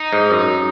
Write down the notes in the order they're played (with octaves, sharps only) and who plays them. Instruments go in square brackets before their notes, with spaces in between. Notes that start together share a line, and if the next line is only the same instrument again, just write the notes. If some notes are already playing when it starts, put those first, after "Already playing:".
Already playing: [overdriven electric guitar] D#4
[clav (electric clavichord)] G#2
F#2